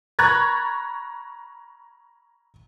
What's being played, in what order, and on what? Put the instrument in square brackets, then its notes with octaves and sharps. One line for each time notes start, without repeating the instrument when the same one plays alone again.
[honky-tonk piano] A#5 B5 C#6 F#6 G#6 A6